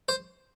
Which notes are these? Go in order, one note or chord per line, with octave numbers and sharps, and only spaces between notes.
C5